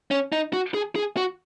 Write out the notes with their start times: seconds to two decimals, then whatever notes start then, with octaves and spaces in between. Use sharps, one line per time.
0.11 C#4
0.32 D#4
0.53 F#4
0.74 G#4
0.96 G#4
1.17 F#4